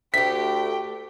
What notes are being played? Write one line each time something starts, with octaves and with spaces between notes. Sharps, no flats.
D2 A3 G4 G5 B6